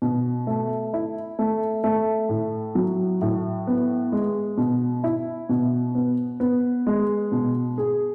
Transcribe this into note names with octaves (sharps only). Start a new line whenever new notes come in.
B2
A3
E4
A3
A3
A2
F#3
A2
B3
G#3
B2
E4
B2
B3
B3
G#3
B2
G#4